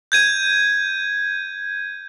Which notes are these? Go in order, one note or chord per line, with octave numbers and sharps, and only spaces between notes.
G6 G#6 D#7